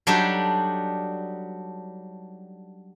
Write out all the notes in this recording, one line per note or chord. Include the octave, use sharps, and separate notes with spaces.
F#3 G3 D4 D#4 G4 A4